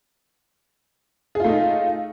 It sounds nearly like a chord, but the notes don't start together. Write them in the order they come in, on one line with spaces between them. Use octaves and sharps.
G#4 F4 A3 D#4